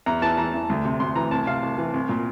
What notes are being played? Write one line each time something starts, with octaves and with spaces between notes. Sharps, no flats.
E2 A#5
E3 A5
E3 A#5
E2
D2
C3
D2 C6
E3 A#5
C2 A5
C3 F5
C2
E3
C2
A#2